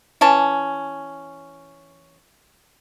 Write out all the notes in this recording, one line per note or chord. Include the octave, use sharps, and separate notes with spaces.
E3 C#4 A5